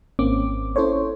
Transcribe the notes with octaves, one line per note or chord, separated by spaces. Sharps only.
G#1 A#3 C4 C#4 D6
C#4 E4 A4 C5 C#5